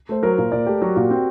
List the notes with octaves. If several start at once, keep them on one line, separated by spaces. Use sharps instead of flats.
A3 C5
F#3 A#4
A#2
A#2 D5
A3 G4
F#3 F#4
A#2 F#4
C4